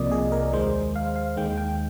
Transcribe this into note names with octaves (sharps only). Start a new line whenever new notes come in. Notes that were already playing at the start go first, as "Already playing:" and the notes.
Already playing: C2 C3 F3 A#3 D5 D#5
G#4
A#4
D#2 D#3 G#3 C5
F5
F5
D#2 D#3 G#3 G5
G5